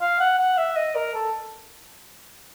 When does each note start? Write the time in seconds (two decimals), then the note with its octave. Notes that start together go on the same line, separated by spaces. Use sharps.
0.01 F5
0.19 F#5
0.39 F#5
0.57 E5
0.76 D#5
0.95 A#4
1.14 A4